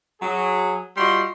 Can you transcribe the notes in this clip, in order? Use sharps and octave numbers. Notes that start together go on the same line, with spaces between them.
F#3 G#4
G3 F4 F#4 D#5 C6